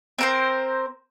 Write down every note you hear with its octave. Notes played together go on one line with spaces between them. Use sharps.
C4 A#4 C5